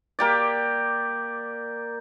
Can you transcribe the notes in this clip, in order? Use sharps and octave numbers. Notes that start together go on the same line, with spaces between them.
A#3 G4 D5